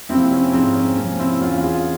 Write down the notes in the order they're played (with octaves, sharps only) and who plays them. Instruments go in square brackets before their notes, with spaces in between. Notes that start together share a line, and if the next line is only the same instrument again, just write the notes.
[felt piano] F2 C3 F3 C4 E4
C#4
G#2 F3 C4
C#4
F2 C3 F3 C#4
C4 E4
E2 E3 C#4 F4
F4 G#4